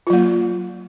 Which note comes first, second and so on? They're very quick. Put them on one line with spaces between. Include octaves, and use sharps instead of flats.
F4 F#3 A#3